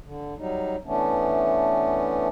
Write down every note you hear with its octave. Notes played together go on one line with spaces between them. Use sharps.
D3
F#3 G3 D#4
E3 A3 B3 C#4 D4